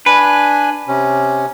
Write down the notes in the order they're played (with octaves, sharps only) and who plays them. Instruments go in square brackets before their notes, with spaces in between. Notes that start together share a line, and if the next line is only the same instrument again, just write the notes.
[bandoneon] D4 G#5 [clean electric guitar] B4
[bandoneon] C3 C#4